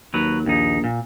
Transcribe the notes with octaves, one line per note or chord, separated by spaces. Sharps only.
D#2 F#3 B4
A#1 D#2 D#4
A#2